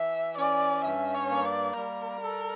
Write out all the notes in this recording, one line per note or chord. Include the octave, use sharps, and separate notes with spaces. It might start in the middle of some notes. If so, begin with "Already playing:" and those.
Already playing: E3 E5
C#4 D5
G2 E5
C#5
A#3
D5
G3 A#4
A4